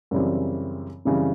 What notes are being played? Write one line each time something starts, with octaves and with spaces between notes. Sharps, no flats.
F#2 C#3 E3 G3 C4
F#2 C#3 E3 G3 C4